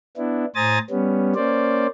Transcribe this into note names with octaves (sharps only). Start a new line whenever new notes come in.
B3 D4 E4
A2 C5 G#5 A#5 D#6 A6
G3 B3 C#4
A#3 C#4 C5 D5